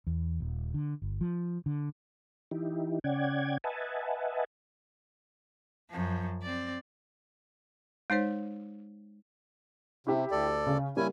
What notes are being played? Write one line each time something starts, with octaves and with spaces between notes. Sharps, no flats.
E2
D#1
D3
G1
F3
D3
E3 D#4 E4 G4
C#3 C#4 D5 F#5 G5 G#6
B4 D#5 E5 F#5 G#5 A5
F#2 F3
C4 D5
G#3 D#4 C5 C#5
C3 E4 G4 E5
D2 A4 D5
C#3
G3 A#3 C#4 E4 G#5